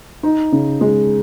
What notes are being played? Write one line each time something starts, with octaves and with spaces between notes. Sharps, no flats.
D#4
C#3
G#3